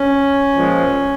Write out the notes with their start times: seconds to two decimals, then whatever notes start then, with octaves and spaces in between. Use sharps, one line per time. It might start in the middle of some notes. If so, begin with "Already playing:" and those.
Already playing: C#4
0.53 A#2 F3 G#3